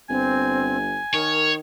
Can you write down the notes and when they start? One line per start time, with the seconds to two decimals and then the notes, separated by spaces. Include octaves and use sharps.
0.10 G1 C4 G#5
1.14 D#3 A#4 C#5